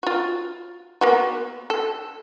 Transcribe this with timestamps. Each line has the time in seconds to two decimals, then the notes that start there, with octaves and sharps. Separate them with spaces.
0.03 F4 F#4
1.01 A#3 B3 F#4
1.70 A4